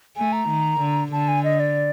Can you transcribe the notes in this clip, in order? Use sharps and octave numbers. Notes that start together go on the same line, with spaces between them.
A3 G#5
A#5
D#3
D3
D3 A5
G#5
D#5
D5